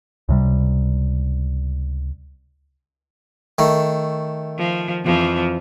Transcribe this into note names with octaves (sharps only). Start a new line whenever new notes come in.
C#2 C3 G3
D#3 A3
F3
F2 E3 F3